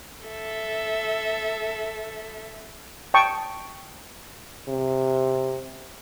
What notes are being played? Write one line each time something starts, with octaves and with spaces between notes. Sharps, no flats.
A4 E5
G5 A5 C#6 D#6
C3